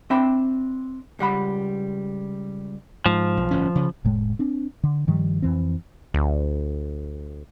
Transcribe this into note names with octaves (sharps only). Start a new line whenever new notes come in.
C4 D4 E5 G5 B5
C#2 G3 F#5 B5
G#2 F3
B1
G1 A2 C#4
C#3
F1 A2 G#3
C4 D4
D3
G2 D#3 F3 G3
F2 E3 C4
D2